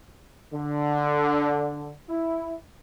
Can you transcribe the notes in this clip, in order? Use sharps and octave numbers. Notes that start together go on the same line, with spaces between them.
D3
E4